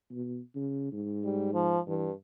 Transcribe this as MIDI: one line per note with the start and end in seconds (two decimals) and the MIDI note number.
0.11 0.40 47
0.55 0.89 49
0.92 1.82 44
1.24 1.52 55
1.54 1.79 53
1.87 2.12 43
1.87 2.09 52